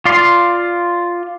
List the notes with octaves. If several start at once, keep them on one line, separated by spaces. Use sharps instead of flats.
F4 D5 C6